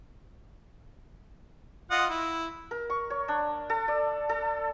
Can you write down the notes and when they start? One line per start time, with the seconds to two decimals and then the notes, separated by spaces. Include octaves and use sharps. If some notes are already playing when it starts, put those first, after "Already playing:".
1.91 F4 D#5 F#5
2.09 E4
2.71 A#4
2.90 C#6
3.10 C#5
3.28 D4
3.70 A4
3.88 D5
4.29 A4